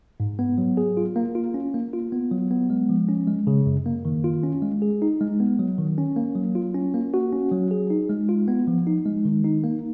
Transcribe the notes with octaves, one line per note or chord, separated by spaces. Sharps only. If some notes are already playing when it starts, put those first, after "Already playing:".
G#2
B3
F#3
G#4
F4
A#3
F4
C#4
A#3
F4
B3
F#3
B3
G#3
F3
C#4
G#3
C#3
F#2
A#3
D#3
F4
C#4
G#3
G#4
D#4
G#3
B3
F#3
D#3
C#4
A#3
F#3
F4
C#4
A#3
F#4
C#4
F#3
G#4
D#4
G#3
F4
B3
F3
D#4
G#3
D#3
D#4
A#3